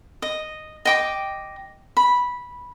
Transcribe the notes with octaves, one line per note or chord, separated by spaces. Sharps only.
D#5
D#5 G5 D6
B5